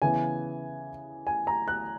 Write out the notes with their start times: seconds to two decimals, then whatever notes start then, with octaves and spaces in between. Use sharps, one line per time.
0.02 C#3 E3 B3 G#5
1.27 G#5
1.47 A#5
1.68 F#6